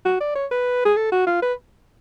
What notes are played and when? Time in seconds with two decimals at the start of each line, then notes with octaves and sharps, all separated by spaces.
0.05 F#4
0.20 D5
0.36 C#5
0.51 B4
0.85 G#4
0.96 A4
1.12 F#4
1.26 F4
1.42 B4